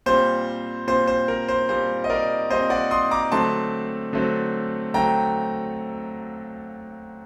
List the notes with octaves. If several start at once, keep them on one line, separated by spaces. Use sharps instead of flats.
A#2 G3 C4 C5
A#2 G3 C4 C5
C5
A#4
C5
A#2 G3 C4 C5
D#5
A#4 D5
A#2 G3 C4 C5 D#5
D5 F#5
C6 D#6
A#5 D6
D3 F#3 A3 C4 A5 C6
D3 F#3 A3 C4
D3 F#3 A3 C4 G5 A#5